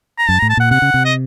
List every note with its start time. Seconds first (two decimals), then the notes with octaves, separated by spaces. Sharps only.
0.18 A#5
0.29 F#2 A5
0.39 A#5
0.42 A2
0.50 A5
0.57 A#2 F#5
0.71 C3 F#5
0.82 C#3
0.94 C3
1.05 D#5